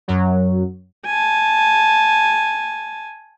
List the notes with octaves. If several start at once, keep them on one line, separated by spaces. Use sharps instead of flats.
F#2 F#3
G#5 A5